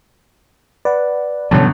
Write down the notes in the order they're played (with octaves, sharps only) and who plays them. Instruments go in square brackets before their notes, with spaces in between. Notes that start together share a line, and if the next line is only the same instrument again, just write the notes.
[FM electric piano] B4 F#5 [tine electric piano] D5
[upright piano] G1 D3 C#4 [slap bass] B2 E3 F#3 [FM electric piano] A5